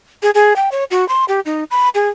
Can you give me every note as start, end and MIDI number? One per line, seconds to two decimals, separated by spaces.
0.23 0.30 68
0.34 0.56 68
0.56 0.69 79
0.72 0.84 73
0.91 1.07 66
1.09 1.25 84
1.28 1.40 67
1.45 1.64 63
1.71 1.89 83
1.95 2.09 68